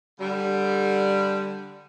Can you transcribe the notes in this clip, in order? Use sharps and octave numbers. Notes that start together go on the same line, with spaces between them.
D3 G3